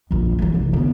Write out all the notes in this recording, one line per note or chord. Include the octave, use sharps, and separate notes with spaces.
A#1 F2
E3 G3
F1
D3 B3